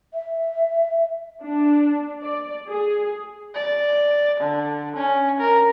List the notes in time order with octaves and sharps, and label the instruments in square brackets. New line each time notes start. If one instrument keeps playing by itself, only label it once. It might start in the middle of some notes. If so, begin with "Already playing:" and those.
[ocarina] E5
[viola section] D4
D5
G#4
[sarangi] D5
D3
C#4
A#4